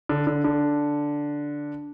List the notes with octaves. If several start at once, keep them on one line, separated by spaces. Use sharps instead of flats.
D3
D3
D3